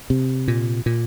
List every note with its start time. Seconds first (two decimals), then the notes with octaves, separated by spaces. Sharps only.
0.10 C3
0.48 A#2
0.86 A#2